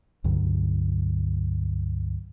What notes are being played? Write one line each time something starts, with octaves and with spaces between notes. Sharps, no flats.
C#2 G2 D3 F#3